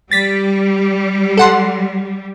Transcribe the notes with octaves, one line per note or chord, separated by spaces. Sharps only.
G3 A6 B6
A4 F#5 C6